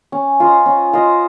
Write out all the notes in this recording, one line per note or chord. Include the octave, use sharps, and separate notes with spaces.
C#4
F4 C5 D#5
C#4
F4 C5 D#5